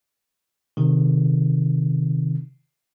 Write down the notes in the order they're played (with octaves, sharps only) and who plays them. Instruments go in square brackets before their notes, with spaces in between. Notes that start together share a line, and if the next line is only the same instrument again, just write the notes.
[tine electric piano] C3 D#3